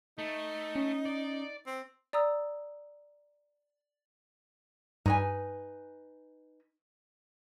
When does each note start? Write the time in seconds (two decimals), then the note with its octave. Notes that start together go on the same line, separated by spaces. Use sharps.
0.18 A3 D#4
0.76 C#4
1.06 D5
1.67 C4
2.13 D5 A#5 D#6 E6
5.06 G2 D#4 B4 G#5